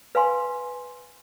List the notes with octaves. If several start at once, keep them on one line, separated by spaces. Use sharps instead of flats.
B4 F5 G#5 C6